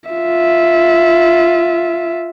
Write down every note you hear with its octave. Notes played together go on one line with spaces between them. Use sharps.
F4 E5